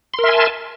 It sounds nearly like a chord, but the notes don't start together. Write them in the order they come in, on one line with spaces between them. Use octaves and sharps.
C6 A#4 E5 G#5 A5